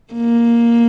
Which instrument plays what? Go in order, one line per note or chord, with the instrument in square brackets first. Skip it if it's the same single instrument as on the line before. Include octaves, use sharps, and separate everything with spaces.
[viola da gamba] A#3